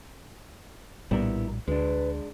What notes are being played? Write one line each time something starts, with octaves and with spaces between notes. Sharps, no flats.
A#1 A2 G3 B3 E4 A#4
D2 G#3 D4 B4